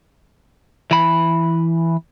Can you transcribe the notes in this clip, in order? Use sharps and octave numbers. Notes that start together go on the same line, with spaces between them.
E3 B5